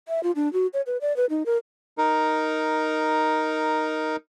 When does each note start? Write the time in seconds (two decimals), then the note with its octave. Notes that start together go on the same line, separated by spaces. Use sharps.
0.08 E5
0.23 F4
0.36 D4
0.53 F#4
0.73 C#5
0.87 B4
1.01 D5
1.17 B4
1.30 D#4
1.46 A#4
1.98 D#4 A#4